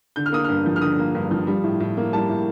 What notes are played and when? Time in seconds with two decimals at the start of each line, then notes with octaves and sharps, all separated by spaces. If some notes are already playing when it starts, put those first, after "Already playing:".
0.16 D3 G6
0.26 F6
0.32 A#3 D#6
0.44 G2 F6
0.66 F3
0.76 F6
0.81 D3 D#6
0.99 A#3
1.15 G2
1.31 F3
1.47 G3
1.64 A2
1.80 A2
1.97 A#3
2.12 G3 A5
2.29 A2